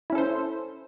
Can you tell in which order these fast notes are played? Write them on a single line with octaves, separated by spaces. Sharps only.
E4 C#4 A4 C5